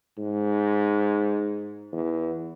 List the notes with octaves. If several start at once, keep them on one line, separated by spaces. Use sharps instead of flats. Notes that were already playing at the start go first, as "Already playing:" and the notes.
G#2
E2